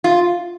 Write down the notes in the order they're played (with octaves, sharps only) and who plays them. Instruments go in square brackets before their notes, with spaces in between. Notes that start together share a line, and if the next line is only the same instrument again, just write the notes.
[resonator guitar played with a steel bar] F4